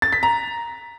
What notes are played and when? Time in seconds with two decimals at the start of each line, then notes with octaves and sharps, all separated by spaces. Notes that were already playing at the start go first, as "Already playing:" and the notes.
0.02 A6
0.13 B6
0.23 A#5